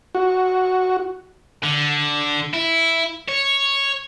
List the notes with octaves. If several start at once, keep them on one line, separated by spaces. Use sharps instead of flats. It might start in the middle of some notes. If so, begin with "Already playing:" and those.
F#4
D3
E4
C#5